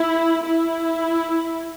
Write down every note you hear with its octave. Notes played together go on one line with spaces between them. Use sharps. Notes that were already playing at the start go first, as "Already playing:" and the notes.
Already playing: E4
E4